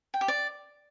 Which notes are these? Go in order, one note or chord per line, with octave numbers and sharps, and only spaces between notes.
G5
G4
D5